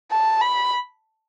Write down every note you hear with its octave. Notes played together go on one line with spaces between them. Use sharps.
A5
B5